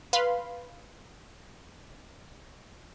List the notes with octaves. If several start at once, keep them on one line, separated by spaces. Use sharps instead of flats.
B4 F5 B5 C6